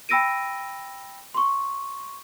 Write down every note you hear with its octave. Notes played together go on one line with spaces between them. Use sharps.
G5 B5 E6 A#6 D7 D#7
C6 C#6